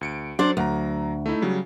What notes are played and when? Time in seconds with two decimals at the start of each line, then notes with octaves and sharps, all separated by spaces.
0.01 D2 C#7 D7
0.39 F#3 D4 C5 D5
0.57 D2 F#3 A#5
1.26 A3 D#4 E4
1.42 C#3 F#3 G3